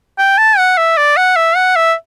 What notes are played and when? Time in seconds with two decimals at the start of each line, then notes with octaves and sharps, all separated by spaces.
0.18 G5
0.38 A5
0.58 F#5
0.78 E5
0.97 D5
1.17 F#5
1.36 E5
1.56 F#5
1.76 E5